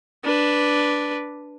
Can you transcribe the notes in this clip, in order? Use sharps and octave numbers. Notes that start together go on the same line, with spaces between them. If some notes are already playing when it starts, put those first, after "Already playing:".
D4 B4